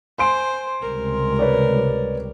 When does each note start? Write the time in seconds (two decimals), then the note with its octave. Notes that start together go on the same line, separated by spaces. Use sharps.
0.18 C5 G#5 C6 D7
0.81 C#2 C3 G3 A#4
1.39 B4 C#5 D5